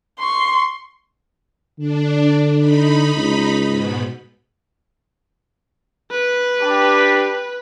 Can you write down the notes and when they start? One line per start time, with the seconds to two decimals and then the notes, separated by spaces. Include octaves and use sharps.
0.19 C6 C#6
1.79 D3 D4
2.57 D#4 B5
3.16 C#2
3.65 G#2 B2
6.11 B4
6.59 D4 G4